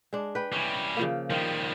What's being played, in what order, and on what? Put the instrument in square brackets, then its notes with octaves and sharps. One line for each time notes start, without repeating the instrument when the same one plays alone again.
[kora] G#3 D4
B4 G5
[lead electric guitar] E3 G3 [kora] C#4
[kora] C#3 F3 A#3
[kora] D#3 [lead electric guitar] F3 G3